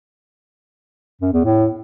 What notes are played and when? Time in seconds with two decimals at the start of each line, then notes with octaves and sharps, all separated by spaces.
1.21 F#2
1.33 E2
1.44 A2